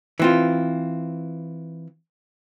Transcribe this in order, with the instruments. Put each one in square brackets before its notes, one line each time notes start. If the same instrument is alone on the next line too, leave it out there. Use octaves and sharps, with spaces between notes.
[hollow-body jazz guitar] E3 C4 F4